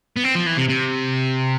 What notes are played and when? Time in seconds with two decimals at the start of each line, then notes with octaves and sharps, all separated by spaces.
0.16 B3
0.24 C4
0.35 F3
0.46 E3
0.57 C3
0.69 C3